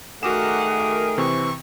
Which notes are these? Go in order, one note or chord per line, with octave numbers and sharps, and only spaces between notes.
D#3 A3 F#4 G#4 A#4 F#5 D6 E7
C3 E3 C4 C#6